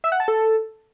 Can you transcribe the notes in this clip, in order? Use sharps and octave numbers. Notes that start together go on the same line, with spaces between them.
E5
F#5
A5
A4